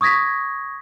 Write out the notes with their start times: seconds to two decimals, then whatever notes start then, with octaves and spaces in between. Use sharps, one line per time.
0.01 C#6 D#6 G#6 A#6 B6